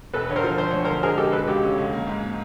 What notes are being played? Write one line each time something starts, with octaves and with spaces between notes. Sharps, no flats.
E1 A4 B4
D3 C#5
A#4 C5
F3
D3 C5
D2 C#5
A#4 C5
D3
G#3 G#4 A#4
G#3 G4 A4
B2 A4 B4
C#2 G4 A4
C#4
C#2
A#3
G#2
A#3